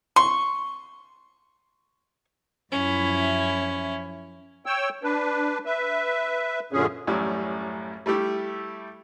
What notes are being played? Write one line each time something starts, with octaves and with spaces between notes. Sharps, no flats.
C6 C#6
F#2 F3 C#4 E4
C#5 G5 E6
D4 B4
B4 E5
F#2 A#2 D3 C#4 G#4
A1 F#2 A2 G3 D5 E6
G3 A3 E4 G4